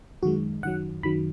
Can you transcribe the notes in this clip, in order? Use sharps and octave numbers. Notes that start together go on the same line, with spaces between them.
F#2 D#3 G#3 F#4
F#2 D#3 F#3 F#5
F#2 D#3 F#3 B5